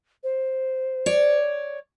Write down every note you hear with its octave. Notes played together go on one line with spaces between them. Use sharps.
C5
C#5 D5